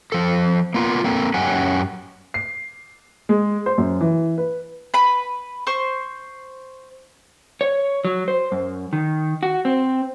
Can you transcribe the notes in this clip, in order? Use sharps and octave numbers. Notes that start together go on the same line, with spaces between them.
F3 A4
A#3 B3 F4
A#3 C4 A4
F#2 C#4 G4 F#5 G#5
C7
G#3
C5
F#2
E3
B4
B4 B5
C5 C6 C#6
C#5
F#3
C5
F#2
D#3
F#4
C4